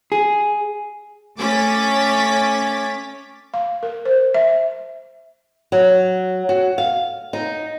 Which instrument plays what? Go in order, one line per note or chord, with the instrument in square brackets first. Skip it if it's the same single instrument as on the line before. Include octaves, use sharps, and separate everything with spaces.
[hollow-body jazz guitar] G#4
[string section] A3 C#4 D6 A6 B6
[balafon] F5
A#4
C5
E5
[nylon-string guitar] F#3
F#4
F5
D#4